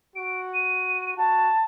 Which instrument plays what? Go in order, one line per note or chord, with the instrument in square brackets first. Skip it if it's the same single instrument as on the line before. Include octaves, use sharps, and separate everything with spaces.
[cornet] F#4 [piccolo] D7
[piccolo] D#7
[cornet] F#4 [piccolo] A5